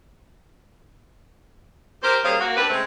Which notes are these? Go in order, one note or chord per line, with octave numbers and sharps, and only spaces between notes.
G4 A#4 C5
G3 A#3 C#4 G#4 C5 F5
A#3 F#4
C4 D4 G4 B4
C#3 G#3 A3 C4